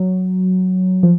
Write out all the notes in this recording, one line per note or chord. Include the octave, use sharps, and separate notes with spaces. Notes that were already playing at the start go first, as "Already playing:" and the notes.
Already playing: F#3
F3